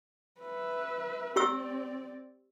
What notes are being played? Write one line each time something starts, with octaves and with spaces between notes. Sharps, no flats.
B4 E5
C4 G4 D5 C#6 E6